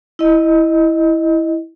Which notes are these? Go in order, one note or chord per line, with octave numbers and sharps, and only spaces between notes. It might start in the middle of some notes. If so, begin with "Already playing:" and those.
E4 D#5